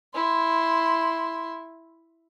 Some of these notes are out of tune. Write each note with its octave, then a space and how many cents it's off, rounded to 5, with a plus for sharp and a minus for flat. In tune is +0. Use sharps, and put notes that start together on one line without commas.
E4 +0 C6 +0